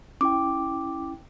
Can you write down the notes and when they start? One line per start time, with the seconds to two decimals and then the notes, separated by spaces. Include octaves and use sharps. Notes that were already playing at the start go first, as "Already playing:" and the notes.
0.21 C#4 E4 G5 D6